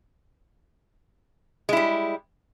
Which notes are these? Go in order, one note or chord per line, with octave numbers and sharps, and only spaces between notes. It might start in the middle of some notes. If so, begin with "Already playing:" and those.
G3 G#3 E4